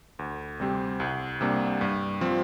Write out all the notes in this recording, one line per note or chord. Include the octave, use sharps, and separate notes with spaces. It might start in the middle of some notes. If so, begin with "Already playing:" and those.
D2
C3 G3 C4 G4
C2
C3 G3 A#3 D4
G2
F3 C4